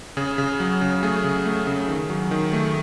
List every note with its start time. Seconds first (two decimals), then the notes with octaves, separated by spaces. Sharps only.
0.17 C#3 G#4
0.38 C#3
0.60 F#3
0.81 C#3
1.03 A3 G#4
1.24 C#3
1.46 A3
1.67 C#3
1.88 D#3
2.09 F#3
2.31 D#3
2.53 A3